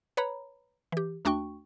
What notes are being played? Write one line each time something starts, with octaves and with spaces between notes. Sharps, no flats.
B4 C#5 A#5 B5
E3 G4
D#2 A3 D4 F#4 G5 C#6